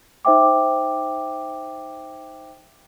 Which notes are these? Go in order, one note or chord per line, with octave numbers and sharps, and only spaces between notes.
D#4 C5 E5 G5 D6